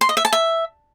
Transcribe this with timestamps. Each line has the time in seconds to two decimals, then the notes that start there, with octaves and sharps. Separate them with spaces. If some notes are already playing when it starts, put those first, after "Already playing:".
0.01 C6
0.09 D#5
0.17 E5
0.25 A5
0.33 E5